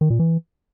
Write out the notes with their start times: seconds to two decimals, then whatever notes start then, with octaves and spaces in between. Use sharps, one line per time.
0.01 D#3
0.10 A#2
0.19 E3